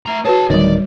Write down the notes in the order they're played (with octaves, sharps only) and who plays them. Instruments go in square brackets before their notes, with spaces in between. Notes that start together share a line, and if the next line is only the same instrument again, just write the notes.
[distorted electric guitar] A3 A#5
[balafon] F#4 B4 C#5 [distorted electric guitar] G#4 A5
[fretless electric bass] D1 D#3 [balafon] G3 C#5 [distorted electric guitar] D5